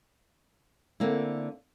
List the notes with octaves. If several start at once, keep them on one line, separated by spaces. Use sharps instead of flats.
D3 A#3 C4 E4